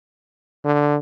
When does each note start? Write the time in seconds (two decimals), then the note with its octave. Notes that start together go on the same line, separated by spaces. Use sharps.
0.65 D3